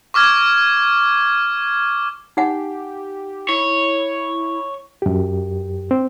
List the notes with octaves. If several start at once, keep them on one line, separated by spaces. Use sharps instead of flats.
C#6 D6 F6 G#6
D#4 G4 F#5 G#5
E4 C#5
F#2 G4
C4